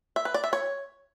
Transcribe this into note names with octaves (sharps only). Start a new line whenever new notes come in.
E5
B4
D5
E5
C#5